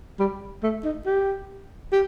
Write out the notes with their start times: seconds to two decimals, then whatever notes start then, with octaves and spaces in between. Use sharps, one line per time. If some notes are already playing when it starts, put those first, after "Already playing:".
0.19 G3
0.63 A3
0.85 D#4
1.06 G4
1.92 G4